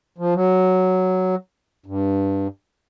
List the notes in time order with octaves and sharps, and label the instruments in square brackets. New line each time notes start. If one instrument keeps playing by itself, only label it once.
[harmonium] F3
F#3
G2